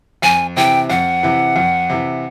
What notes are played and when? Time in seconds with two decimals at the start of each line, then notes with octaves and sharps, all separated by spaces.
0.22 F2 G#5
0.56 C3 E3 G5
0.90 F2 F#5
1.23 C3 E3
1.56 F2
1.90 C3 E3